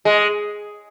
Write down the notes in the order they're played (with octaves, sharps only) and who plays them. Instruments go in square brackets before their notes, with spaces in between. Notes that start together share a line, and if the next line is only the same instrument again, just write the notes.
[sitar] G#3